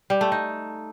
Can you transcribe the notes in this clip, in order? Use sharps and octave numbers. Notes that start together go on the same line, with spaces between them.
G3
A3
D#4